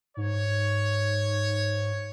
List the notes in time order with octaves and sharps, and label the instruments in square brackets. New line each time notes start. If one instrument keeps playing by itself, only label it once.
[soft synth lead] G#2 [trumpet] C#5